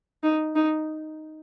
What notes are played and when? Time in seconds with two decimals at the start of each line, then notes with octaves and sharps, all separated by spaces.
0.24 D#4
0.56 D#4